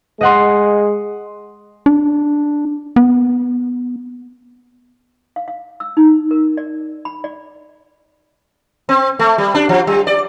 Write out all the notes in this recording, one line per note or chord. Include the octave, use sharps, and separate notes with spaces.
G#3 D#5 F#5 C6
D4
B3
F5
F5
E6
D#4
A#4
D5
B5
D5
C4
A3
G3
D4
F3
G3
D5